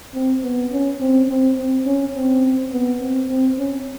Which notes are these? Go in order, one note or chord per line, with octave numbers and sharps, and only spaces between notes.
C4
B3
C#4
C4
C4
C4
C#4
C4
B3
C4
C4
C#4